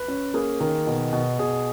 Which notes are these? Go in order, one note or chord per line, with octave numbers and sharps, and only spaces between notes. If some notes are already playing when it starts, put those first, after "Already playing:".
Already playing: B4
C#4
A#3 G#4
D#3
B2
B2
B2 G#4